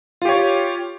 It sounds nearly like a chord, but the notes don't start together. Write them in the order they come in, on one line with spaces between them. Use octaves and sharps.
F4 G4 C#5